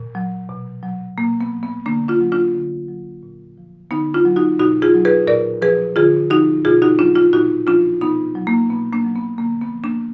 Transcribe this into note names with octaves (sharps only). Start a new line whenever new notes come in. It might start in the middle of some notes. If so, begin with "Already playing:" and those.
Already playing: A#2
F#3
B2
F#3
B2 A#3
B3
F#3
B3
D3 A#3 D4
D4 F4
F#3
D4 F4
D3
F#3
A#2
F3
D3 B3 D#4
D4 F4
F#3
D#4 F#4
B2 D#4 F#4
F4 G#4
F#3
G#4 B4
A#2 A#4 D5
F3 G#4 B4
D3 F4 G#4
F3 D#4 F#4
B2 F4 G#4
D#4 F#4
F#3 D4 F4
D4 F4
A#2 D#4 F#4
F3 D4 F4
B2 B3 D#4
F#3
A#3
B2 B3
A#3 D4
F#3
B3
D3 A#3
B3
F3
A#3 D4